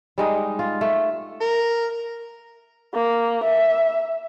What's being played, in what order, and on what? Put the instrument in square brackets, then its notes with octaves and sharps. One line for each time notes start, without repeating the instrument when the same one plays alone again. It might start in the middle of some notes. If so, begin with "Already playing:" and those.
[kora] G3 G#3 D#4
F4
A3
[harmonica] A#4
[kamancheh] A#3
E5